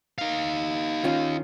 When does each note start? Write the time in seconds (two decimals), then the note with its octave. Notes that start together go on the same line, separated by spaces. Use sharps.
0.18 D#4 F5
1.04 D#3 C#4 F4